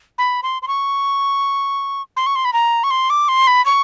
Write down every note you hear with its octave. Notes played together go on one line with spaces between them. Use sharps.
B5
C6
C6
C#6
C6
C#6
C6
B5
A#5
C#6
C6
D6
C6
B5
C#6